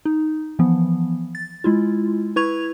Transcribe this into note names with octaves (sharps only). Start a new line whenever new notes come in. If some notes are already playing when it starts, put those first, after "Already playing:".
D#4
E3 F3 B3
A6
G#3 E4 F4
E4 B4 C#6 G#6 F7